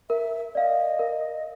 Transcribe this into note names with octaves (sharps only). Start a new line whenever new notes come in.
A#4 E5
D5 D#5 F5
A#4